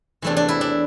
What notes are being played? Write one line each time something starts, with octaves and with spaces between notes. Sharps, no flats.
E2 C3 E3 A3 D4
D4
E4
D4